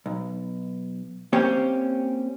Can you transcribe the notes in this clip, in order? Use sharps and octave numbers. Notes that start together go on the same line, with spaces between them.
B1
A#3 C4 C#4 G4 C5 C#5